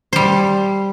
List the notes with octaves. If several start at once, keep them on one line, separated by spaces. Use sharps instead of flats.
G3 C5